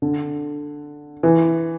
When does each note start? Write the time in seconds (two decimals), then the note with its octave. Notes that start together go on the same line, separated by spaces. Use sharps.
0.02 D3
1.23 E3